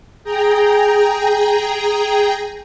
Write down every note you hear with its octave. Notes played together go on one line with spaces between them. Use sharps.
G#4 G5 A#5